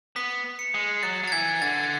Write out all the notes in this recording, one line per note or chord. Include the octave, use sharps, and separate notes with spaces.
B3 B6
C#7
G#3
F#3 A6
F#3
A6
E3 G#6
D3 A6